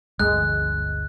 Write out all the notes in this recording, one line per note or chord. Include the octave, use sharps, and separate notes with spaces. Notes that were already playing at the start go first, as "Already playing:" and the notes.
G1 D2 D3 G#3 F#6